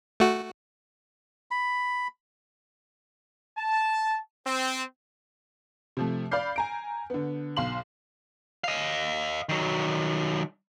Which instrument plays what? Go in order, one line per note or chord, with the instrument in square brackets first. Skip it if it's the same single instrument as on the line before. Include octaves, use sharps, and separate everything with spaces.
[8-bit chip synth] A3 F#4
[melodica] B5
[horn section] A5
C4
[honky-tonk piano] C3 F3 A3
D5 F5 B5 F6 G6 C7
G#5 A#5 D7
D3 B3
B1 F5 C6 F#7
[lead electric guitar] D#5 F5
D#3 F#3